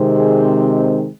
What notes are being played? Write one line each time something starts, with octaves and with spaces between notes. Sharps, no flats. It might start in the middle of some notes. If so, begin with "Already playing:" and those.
Already playing: C3 D#3 G#3 C4
G#4